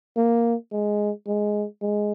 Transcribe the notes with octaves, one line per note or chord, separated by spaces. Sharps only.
A#3
G#3
G#3
G#3